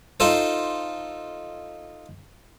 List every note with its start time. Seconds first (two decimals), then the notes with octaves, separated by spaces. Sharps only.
0.20 D#4 F4 A4 C5